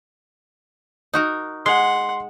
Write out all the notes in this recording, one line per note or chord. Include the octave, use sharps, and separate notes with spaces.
D#4 F#4 A#4
G#3 F#5 C6